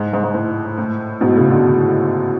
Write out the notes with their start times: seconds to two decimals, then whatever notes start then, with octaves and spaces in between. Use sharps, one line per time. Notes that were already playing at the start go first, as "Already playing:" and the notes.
Already playing: G#2
0.13 G#2
0.24 G#2
0.34 A2
0.78 A2
1.21 G#2 B2
1.36 A2 C#3
1.50 B2 D3